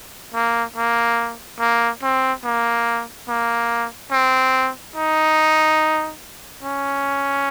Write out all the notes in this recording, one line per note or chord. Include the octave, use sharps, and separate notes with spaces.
A#3
A#3
A#3
C4
A#3
A#3
C4
D#4
C#4